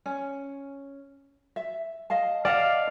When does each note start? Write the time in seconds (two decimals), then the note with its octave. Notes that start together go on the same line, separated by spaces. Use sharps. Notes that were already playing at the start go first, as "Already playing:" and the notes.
0.06 C#4
1.56 E5
2.10 D#5 F5 A5
2.45 D5 D#5 F5 F#5 A5